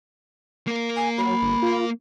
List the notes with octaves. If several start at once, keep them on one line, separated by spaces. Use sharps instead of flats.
A#3 A#4
G#5
F#3 B5
G1
F4